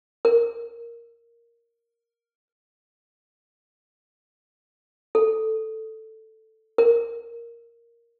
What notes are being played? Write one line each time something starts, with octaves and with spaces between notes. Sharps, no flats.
A#4
A4
A#4